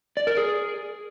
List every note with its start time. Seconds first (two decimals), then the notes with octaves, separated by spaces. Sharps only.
0.17 D5
0.27 A#4
0.37 G#4